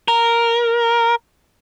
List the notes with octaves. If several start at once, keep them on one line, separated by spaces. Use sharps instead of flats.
A#4